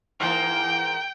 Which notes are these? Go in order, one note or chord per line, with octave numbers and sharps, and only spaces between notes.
G#2 E3 A#3 G5